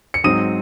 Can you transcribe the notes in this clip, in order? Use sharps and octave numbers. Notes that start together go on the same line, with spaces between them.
C#7
G#2 F#3 C4 D#4 D#6 D#7